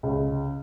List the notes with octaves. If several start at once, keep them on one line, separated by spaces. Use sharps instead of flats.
C#2